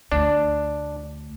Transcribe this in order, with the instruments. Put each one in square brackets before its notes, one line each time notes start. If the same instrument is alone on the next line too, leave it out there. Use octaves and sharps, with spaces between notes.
[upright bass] D2 A3 [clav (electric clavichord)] D4